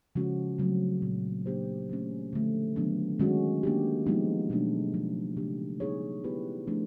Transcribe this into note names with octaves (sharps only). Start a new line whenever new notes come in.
C#3 F3 G#3 C#4 F#4
C#3 F#3 A3 C4
A#2 F3 A#3
A#3 D4 G4 C5
E3 A3 C#4
D3 F3 A3
D#3 F#3 B3 D4
D#3 G#3 C#4 F#4
A#3 D4 G4
F3 G#3 B3 D#4
B2 F#3 A3 D4
C#3 F3 G#3
C#3 F3 A3 D4 G4
G3 B3 D#4 G#4 C#5
B3 E4 G4 B4
F3 A3 D4